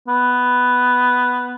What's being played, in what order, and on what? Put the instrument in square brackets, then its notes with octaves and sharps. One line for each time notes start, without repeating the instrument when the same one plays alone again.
[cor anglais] B3